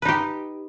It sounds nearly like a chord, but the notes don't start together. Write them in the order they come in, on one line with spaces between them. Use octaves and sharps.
B4 D#4 G4